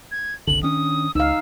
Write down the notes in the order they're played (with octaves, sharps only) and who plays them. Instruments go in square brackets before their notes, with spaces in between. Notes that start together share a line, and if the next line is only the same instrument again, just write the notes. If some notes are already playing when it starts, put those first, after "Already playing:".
[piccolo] G#6
[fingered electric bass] F#1 C2 D3 [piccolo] F#7
[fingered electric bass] D#3 C#4 D4 [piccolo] D#6
[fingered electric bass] C#2 [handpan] D#4 F5 [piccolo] E6